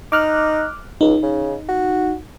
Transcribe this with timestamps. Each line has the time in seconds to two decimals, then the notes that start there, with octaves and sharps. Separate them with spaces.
0.12 D#4 D6 F6 F#6
1.01 C#2 D#4
1.23 C#3
1.69 F#4